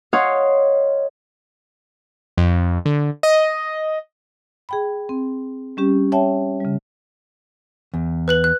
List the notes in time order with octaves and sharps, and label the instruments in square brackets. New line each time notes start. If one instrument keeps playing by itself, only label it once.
[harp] C#5 D#5 F5 F#5 C6
[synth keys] F2
D3
D#5
[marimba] G#4 G5 B5
C4
G3 C#4 G4
C#5 E5 G5 A5
C#3 G3
[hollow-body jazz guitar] E2
[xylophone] B4 F#6 F#7
F#6